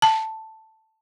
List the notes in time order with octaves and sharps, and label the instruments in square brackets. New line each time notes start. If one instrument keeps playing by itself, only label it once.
[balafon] A5